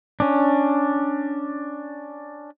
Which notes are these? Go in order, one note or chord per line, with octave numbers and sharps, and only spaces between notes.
C#4 D4